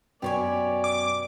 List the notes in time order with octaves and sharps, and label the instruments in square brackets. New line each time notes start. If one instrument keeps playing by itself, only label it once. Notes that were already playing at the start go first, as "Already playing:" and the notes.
[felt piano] F#2 B2 B4 [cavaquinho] G4 C#5 G#5 [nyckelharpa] D5
[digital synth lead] D6